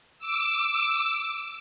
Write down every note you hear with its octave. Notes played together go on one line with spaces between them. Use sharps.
D6 E6